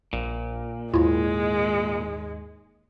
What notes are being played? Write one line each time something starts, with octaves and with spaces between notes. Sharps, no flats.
A#1 A#2
D#2 G#2 G#3 E4 F4